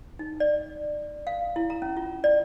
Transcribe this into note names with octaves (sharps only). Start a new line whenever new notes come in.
D#4
D5
F5
E4
A#5
C#4
F4
D5